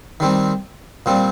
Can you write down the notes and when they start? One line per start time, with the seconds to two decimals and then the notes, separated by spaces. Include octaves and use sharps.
0.20 D#3 G3 C4
1.06 A#2 G3 C4